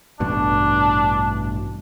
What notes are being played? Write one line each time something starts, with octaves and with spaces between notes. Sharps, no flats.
A1 G2 B2 D4